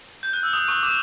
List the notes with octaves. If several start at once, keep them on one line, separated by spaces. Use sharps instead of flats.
G6
F#6
E6
D#6
C#6
D6